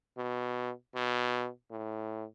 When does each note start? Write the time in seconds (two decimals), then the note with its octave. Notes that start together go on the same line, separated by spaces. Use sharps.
0.18 B2
0.95 B2
1.71 A2